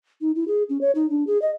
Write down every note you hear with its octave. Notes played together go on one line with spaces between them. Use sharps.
D#4
E4
G#4
C#4
C#5
D#4
D4
G#4
D#5